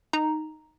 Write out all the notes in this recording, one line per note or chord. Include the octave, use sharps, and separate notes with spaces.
D#4 A#5